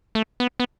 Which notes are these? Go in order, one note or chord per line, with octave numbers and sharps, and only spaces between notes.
A3
B3
B3